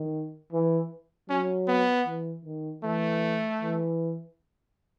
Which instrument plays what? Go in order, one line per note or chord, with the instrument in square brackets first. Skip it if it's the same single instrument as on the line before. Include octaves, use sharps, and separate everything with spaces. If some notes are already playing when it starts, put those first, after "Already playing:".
Already playing: [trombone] D#3
E3
[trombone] F#3 [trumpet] C#4
[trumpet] B3
[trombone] E3
D#3
[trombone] E3 [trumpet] A3
[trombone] E3